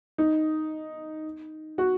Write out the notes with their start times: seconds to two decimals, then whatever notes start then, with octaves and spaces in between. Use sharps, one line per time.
0.18 D#4
1.78 F#4